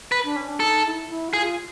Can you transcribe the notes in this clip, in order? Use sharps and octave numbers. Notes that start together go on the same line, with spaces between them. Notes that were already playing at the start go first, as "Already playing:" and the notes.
B4
D4
C#4
D4
D#4 A4
E4
E4
F#4
F4 G#4